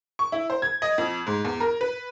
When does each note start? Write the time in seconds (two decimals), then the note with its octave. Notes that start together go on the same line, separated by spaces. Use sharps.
0.19 C#6
0.32 E4
0.50 C5
0.62 G#6
0.82 D#5
0.98 F2
1.27 G#2
1.45 E2
1.60 A#4
1.81 B4